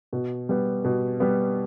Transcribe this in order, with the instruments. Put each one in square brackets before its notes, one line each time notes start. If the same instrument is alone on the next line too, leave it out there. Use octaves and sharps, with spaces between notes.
[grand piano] B2
G3 B3
B2
G3 B3